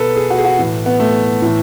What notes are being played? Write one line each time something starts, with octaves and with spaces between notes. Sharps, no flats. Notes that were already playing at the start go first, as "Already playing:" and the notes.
Already playing: B2 A4 B4
G#4
F#4
G#4
F#4
A2 E3
B3
A3
A2 E3